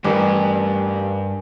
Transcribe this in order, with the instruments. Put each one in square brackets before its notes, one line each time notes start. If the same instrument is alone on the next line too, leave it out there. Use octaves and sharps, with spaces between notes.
[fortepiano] A1 [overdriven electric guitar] G2 [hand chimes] A#4 B4 G#5